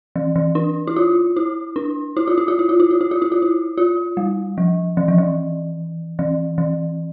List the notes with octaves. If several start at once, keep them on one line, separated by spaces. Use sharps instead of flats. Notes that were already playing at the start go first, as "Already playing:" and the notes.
E3
E3
D4
E4
F4
E4
D4
E4
F4
E4
F4
E4
F4
E4
F4
E4
F4
E4
F4
E4
F4
G3
F3
E3
F3
E3
E3
E3